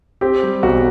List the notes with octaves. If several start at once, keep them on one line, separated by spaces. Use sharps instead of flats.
C4 G4
G3
B1 F#4